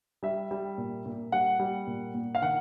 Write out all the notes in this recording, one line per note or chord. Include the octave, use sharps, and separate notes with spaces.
G3 E5
G3
A#2
A#2
G3 F#5
G3
A#2
A#2
F5
D#3 F#5